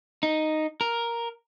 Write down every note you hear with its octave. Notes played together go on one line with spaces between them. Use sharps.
D#4
A#4